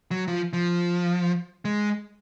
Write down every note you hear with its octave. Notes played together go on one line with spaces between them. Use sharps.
F#3
F3
F3
G#3